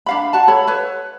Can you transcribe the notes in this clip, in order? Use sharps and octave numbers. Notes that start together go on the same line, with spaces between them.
D4 F5 B5
F#4 A5
A4 C#5 B5
B4 C#5